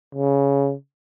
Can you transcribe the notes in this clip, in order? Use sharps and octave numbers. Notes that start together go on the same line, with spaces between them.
C#3